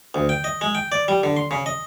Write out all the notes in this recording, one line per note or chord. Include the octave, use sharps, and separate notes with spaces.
D2
G5
D#5
G#3
G5
D5
G3
D3
C6
C#3
D#5